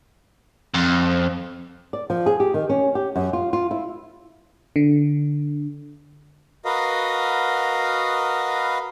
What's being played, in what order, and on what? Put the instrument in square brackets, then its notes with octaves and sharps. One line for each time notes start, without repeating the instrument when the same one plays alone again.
[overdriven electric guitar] F2
[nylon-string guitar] D5
F3
G#4
G4
D#3
C#4
G4
F#2
F4
F4
E4
[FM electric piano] D3
[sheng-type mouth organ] F#4 A#4 B4 D#5 F5